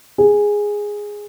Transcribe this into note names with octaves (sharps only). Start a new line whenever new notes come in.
G#4